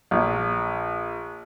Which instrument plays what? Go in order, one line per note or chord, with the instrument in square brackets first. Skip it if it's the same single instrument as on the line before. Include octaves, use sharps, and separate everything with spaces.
[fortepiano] A#1